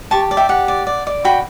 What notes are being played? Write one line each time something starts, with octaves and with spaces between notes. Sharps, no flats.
G4 A5 C#6
D5
E5 G5
G4 F#5
D5
D5
D5
F#4 G5 B5